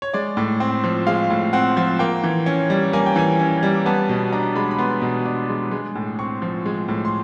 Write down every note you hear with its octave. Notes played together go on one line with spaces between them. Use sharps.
C#5
G#3 D5
A2
C4
F3
G#3 F5
A2
C4 F#5
F3
A#3 G5
E3
C#4
G3
A#3 G#5
G5
E3 G#5
C#4
G3
B3 A5
B2
D4 A#5
G#3 B5
B5
B3 C6
B2
D4
G#3
G#3
A2
C4 C#6
F3
G#3
A2
C6